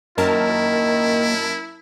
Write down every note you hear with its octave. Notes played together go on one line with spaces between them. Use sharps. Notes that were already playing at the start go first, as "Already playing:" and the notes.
F#2 D#3 A#3 E4 A#4 A5